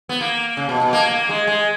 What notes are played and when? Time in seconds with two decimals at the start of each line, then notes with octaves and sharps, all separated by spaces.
0.09 B3
0.21 A#3
0.57 C#3
0.69 B2
0.81 B2
0.93 A#3
1.11 A#3
1.29 G#3
1.47 G#3